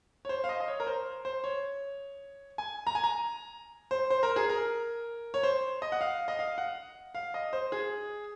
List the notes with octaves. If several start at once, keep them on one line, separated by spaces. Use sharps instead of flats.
C#5
C5
F5
D#5
D#5
C#5
A#4
C5
C5
C#5
G#5
A#5
G#5
A#5
C5
C5
A#4
G#4
A#4
C#5
C5
D#5
F#5
F5
D#5
F5
F#5
F5
D#5
C5
G#4